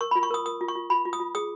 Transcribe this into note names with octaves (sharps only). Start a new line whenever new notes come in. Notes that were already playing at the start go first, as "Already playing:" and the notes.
A#4 C#6
B5
F4
C#6
A#4 D#6
A#4 D#6
F4
C#6
F4
F4 B5
F4
D#6
F4
G#4 D#6